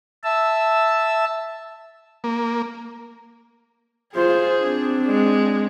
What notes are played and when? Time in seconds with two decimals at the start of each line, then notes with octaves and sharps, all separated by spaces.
0.24 E5 A5 E6
2.24 A#3
4.15 F4 G#4 C5
4.62 C4 D4
5.07 G#3